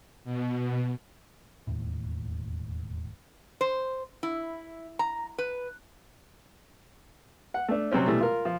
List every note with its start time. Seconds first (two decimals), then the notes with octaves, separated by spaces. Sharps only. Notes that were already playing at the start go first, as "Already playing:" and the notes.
0.24 B2
1.67 E1 D#2 A2
3.61 C5
4.23 E4
4.99 A#5
5.38 B4
7.54 F#5
7.68 A3 D4
7.92 C3 F#3 G3 C4 C#4
8.06 B2 E3 G3 A3
8.20 F4 A#4
8.45 F3